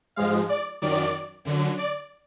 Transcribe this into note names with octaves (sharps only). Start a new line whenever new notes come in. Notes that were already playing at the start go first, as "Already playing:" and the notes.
G#2 F3 G#3 F5
D5
F#2 D#3 F#3 D5
F#2 D3 F#3
D5